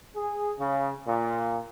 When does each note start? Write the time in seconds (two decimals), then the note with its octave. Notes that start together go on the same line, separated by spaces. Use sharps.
0.16 G#4
0.59 C#3
1.07 A#2